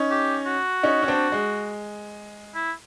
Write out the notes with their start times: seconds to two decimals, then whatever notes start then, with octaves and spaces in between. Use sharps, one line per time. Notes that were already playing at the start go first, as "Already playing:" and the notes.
Already playing: C#4 D#4
0.11 G4
0.47 F#4
0.83 C#4 D#4
1.03 C#4
1.08 C4 D4
1.32 G#3
2.55 E4